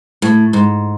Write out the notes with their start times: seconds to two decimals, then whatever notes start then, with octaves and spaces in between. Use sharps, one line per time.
0.22 A2
0.53 G#2